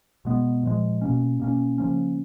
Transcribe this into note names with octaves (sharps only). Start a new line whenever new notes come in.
B2 G#3 B3
A#2 F3 G#3
B2 A#3 C#4
B2 A#3 C#4
C#3 F3 A#3 C#4